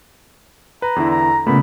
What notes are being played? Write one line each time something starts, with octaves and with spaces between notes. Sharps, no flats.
B4 A#5
E2 D3 E4
A#5
A#2 C#3 A3 B3 B5